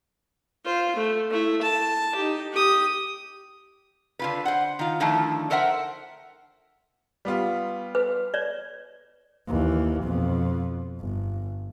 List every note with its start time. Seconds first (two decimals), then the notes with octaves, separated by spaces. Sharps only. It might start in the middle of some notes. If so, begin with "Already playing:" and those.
0.64 F4 C5
0.96 A3
1.30 A3 E4
1.62 A5
2.15 D#4 G4
2.53 G4 D#6
4.19 D3 F4 B4
4.45 C5 F#5
4.79 D#3 F4
5.00 D3 D#3 F3 A3 E4
5.50 A4 A#4 C5 E5 F#5 G5
7.25 G3 B3 F4
7.95 B4
8.34 C#5 D5
9.48 D#2 E3
10.03 F2 B2
11.00 G1